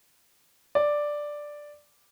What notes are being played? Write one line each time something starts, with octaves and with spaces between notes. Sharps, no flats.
D5